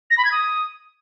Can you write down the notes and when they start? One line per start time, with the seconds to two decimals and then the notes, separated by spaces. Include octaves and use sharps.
0.11 A#6
0.18 B5
0.25 G#6
0.32 D#6